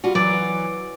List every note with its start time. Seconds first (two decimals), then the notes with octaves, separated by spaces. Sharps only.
0.04 G3 F4 F#4
0.15 E3 F#3 D5